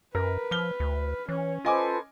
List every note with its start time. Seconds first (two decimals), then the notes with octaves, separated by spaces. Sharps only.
0.15 F#2 A#4 B4
0.51 F3 F6 G7
0.80 D2
1.29 E3 C#4 C#5
1.65 F4 A4 B4 C5 D#5 G#5 D6